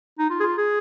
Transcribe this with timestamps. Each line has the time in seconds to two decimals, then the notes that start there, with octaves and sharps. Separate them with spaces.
0.19 D#4
0.30 F4
0.40 G#4
0.43 F4
0.58 G#4